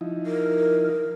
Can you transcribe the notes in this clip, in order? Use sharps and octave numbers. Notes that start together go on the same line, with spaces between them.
F3 D#4 E4
A#4